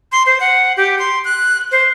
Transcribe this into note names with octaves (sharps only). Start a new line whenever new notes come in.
C6
C5
F#5
G4
C6
F#6
C5